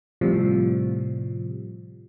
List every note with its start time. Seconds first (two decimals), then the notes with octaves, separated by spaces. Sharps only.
0.21 A2 C3 F3 G3